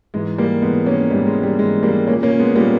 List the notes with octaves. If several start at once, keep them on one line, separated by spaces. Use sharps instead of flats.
G#2 E3 G#3
G3 A#3
G#2 E3 G#3 B3
A#3 C#4
G#2 E3 G3
G#3
G3
G#2 E3 G#3
G3 A#3
A#2 A#3 C#4
A#3 C#4
G#3 B3
A#2 G3 A#3